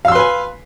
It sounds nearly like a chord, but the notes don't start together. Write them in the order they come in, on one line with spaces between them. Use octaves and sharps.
F5 E6 C6 B4 G#5